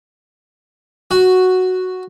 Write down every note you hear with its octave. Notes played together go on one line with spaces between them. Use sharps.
F#4